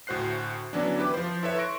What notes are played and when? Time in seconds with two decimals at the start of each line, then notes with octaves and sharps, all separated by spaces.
0.07 D2 A2 F#4 C5 F#6 C7
0.73 D3 E3 F#3 B3 C#4 D4
0.98 E4 G4 B4 D6
1.14 F3 C5
1.43 E4 A4 B4 C#5 E5
1.57 C6 C#6 F#6 A#6 D7